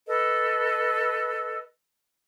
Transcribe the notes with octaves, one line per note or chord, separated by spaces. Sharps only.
A4 B4 D#5